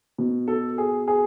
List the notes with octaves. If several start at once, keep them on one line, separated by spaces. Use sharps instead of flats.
B2
A4
G#4
G#4